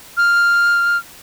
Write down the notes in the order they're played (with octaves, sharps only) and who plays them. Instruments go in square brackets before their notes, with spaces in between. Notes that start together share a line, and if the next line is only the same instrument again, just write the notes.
[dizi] F6